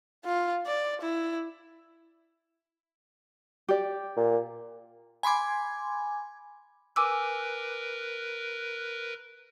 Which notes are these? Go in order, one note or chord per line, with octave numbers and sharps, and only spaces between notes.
F4
D5
E4
G4 D5
A#2
G#5 B5 C6 D6 G#6
A#4 B4 G#5 D6 E6